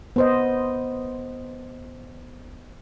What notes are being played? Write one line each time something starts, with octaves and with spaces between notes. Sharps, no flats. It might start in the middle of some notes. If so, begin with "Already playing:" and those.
B3 C5 D#5